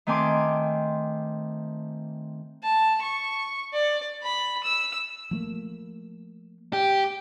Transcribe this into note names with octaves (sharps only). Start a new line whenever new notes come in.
D#3 A3 C4 G#5 C6 D6
A5
C#6
D5
B5
E6
F3 A3 A#3
G4